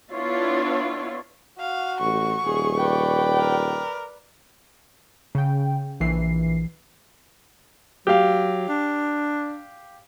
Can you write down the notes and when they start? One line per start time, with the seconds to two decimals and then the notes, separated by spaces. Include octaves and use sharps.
0.12 B3 D4 E4 F4 C#5
1.60 F#4 F5
2.00 A1 C#6
2.45 D#1 G#4
2.77 B4 D5 G5
3.40 A#4
5.35 C#3 G5
6.00 A#1 E3 C7
8.07 F#3 G4 F5
8.69 D4